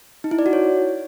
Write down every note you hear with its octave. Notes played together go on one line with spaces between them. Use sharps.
D#4
E4
D5
F#4
C#5